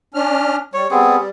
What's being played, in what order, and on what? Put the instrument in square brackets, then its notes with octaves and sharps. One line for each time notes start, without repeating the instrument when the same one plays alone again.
[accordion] C#4 D4 F6
[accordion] G3 [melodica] C#5
[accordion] G3 [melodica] B3 C4 G#4